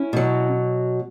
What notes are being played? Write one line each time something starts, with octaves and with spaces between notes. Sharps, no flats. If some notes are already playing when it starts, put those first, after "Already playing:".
Already playing: C#4 E4
B2 F#3